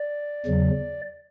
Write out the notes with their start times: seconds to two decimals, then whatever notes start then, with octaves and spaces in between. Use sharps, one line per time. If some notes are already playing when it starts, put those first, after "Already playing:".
Already playing: D5
0.46 E2 C#3 F#3